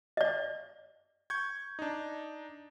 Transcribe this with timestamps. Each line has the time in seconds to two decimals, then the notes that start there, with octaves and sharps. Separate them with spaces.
0.17 D5 D#5
1.30 C#6 G6 G#6
1.79 D4 D#4